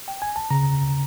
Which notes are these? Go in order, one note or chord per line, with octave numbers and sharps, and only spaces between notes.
G5
G#5
A5
C#3 A#5